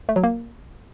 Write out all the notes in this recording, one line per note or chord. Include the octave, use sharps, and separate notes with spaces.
A3
F#3
A#3